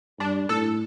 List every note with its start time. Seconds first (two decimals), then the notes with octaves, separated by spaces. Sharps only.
0.19 G2 D4
0.49 A2 A4